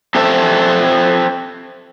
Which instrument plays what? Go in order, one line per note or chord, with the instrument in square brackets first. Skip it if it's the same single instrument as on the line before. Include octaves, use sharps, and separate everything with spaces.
[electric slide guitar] C4 A4 C5 E5